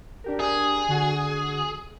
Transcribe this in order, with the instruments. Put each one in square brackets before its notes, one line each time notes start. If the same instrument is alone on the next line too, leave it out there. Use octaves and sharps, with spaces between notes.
[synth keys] D4 G4 A#4
[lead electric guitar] G#4
[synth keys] D3 F#4